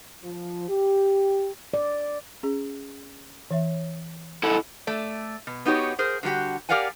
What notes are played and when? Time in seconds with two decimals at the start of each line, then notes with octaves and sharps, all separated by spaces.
0.24 F3
0.69 G4
1.74 D5
2.43 C#4 G#4
3.51 E3 C#5 E5
4.43 E4 A4 F#5
4.87 A3 A4 D5
5.47 B2
5.65 B3 D#4 F#4 G4 C#5
5.99 G#4 A#4 C5
6.23 D3 G3 A#3 F#4 G4
6.69 G4 A#4 D5 F5 F#5 G#5